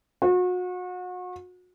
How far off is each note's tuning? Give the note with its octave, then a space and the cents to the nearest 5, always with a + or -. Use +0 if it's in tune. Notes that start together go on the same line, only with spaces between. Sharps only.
F#4 -35